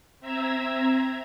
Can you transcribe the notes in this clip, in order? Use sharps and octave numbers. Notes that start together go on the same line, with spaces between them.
C4 E5 A#5 E6 G#6